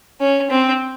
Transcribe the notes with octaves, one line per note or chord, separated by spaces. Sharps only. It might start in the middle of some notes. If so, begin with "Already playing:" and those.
C#4
C4